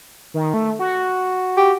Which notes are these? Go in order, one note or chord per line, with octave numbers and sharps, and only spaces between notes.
D#3
A3
F#4
G4